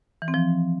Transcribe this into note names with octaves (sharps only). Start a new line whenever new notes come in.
E3
C4
F3